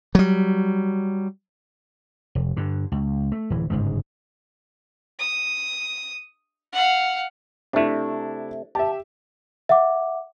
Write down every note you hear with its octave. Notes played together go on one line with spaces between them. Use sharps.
F#3 G3
F1
G2 D3
C#2
A3
D1 E3
G1 G#2 C#3 G#3
D#6
F5 F#5
C3 A3 D4 E4
G4 E5 A5
E5 F#5 D6